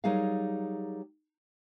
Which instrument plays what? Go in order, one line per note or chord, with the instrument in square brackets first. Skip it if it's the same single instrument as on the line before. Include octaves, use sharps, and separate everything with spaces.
[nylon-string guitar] F#3 G3 D#4 G#4 A#4 F5